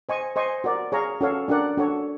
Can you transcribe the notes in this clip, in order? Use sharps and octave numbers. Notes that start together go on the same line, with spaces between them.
C5 D#5 G#5 C#6
C5 D#5 G#5 C#6
F#4 A#4 D5
G#4 C#5 F5 A#5
C#4 F#4 A4 C#5 F5
D4 F#4 A#4 D5 F#5
D4 F#4 A4 C#5